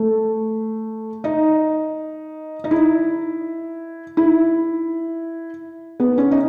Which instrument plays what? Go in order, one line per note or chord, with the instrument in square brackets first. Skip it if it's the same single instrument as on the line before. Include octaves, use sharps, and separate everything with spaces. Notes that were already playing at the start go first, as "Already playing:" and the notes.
Already playing: [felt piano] A3
D#4
D#4
E4
E4
B3
C#4
D#4